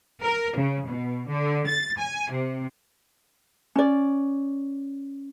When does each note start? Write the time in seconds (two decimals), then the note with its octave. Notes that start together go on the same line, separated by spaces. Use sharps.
0.22 A#4
0.56 C#3
0.87 B2
1.28 D3
1.66 A6
1.98 G#5
2.30 C3
3.75 C#4 D5